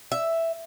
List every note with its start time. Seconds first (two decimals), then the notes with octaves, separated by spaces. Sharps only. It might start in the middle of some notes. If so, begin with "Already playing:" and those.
0.12 E5